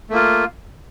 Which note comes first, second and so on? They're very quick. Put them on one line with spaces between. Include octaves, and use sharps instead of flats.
A3 A#3 F4